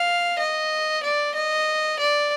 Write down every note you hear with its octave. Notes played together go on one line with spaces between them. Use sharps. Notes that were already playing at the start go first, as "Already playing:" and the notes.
Already playing: F5
D#5
D5
D#5
D5